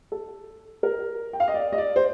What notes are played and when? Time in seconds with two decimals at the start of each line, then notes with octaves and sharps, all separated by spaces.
0.12 A4
0.83 A#4
1.33 G5
1.40 F5
1.48 D#5
1.54 D5
1.73 D#5
1.78 D5
1.96 C5